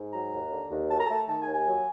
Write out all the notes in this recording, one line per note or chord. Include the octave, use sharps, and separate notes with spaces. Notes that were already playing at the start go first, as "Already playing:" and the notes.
Already playing: G#2
F#3 A#5
D#2
D3
D#2
F#3 A5
A#5
A3 A5
D#3 A5
G#5
D#2
G#5
F#3